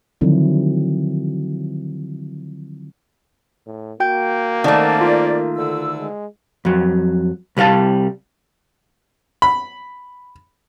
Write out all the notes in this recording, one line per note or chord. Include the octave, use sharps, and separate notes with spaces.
D3 D#3 F3 F#3 C4 E4
A2
A#3 F#4 G5 G6
D#3 A3 C4 C#4 D5 F#5 A5
F4
D2 D3 E6
G#3
F2 F#3
C2 G3 D5 F5 A5
B5